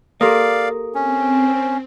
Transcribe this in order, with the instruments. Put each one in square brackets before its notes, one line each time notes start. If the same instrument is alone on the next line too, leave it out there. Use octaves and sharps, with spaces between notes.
[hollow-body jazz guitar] A#3 [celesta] G4 A4 D#6 [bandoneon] D5 F5
[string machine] C4 [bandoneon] C#4